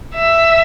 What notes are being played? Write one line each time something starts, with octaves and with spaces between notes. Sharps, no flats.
E5